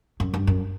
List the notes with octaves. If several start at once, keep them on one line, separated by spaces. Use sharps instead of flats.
F#2
G2
F#2